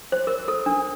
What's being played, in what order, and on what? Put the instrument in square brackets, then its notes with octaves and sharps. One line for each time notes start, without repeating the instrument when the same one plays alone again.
[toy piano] C5
A#4
A4
D4